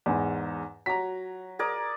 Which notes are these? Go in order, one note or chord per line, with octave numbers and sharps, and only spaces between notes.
E2 G#2
F#3 A#5 B6
G#4 A#4 D5